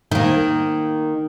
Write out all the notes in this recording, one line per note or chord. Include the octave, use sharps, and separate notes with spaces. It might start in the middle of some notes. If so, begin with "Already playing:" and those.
D#3 A#3